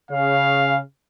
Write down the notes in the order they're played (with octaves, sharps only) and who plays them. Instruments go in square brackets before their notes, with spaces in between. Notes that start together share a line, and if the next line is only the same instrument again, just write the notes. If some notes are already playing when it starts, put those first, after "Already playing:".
[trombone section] C#3 [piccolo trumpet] F5